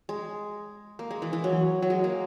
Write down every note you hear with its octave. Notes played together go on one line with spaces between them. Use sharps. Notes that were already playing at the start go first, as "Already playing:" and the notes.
G#3
A#3
G#3
E3
E3
F#3
F#3
G#3
A#3